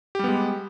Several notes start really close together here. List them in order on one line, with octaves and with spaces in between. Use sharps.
G4 G3 B3 G#3